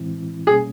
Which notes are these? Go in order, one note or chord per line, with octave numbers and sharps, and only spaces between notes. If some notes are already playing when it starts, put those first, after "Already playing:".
Already playing: A2 E3 G#3 C4 E4
B2 G3 A#3 C#4 G#4